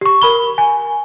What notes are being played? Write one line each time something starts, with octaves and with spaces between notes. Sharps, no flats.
G4 C#6
A#4 B5 G7
G#5